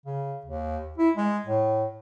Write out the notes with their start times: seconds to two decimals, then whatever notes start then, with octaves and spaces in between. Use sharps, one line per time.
0.06 C#3
0.45 D#2
0.98 E4
1.16 G#3
1.46 A2